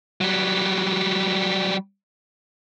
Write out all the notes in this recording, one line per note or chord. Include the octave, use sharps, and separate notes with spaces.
F#3 G3